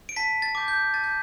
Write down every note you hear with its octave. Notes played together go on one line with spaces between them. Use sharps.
D7
A5 B6
A6
D6 G6
G6
A5 A6
G6